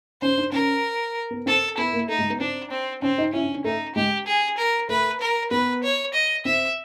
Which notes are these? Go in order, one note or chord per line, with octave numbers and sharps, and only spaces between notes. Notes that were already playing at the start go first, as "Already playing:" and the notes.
C#4 C5
D4
C#4 A#4
B3
C4 A4
B3 E4
A#3
A3 D#4
G#3
B3
C4 D4
C4
C4 C#4
D#4
C#4 E4
D4
D4
A3 D#4
G#3 G4
G#4
A#4
A3 B4
A#4
B3 B4
C#5
D#5
C4 E5